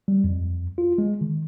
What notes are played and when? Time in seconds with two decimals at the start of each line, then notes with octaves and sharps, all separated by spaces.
0.08 G3
0.24 F2
0.78 F4
0.98 G#3
1.21 D#3